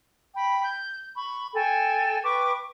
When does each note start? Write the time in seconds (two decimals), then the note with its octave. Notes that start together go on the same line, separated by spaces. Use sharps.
0.36 G5 B5
0.64 G6
1.15 B5 C#6
1.54 A4 G5 G#5
2.24 B4 G5 C#6 D6